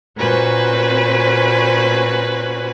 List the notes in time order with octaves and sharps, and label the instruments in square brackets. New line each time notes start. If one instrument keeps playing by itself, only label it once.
[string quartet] A#2 C#4 F#4 B4 C5